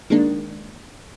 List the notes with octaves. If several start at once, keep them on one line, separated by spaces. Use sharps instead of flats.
D#3 G#3 A#3 D4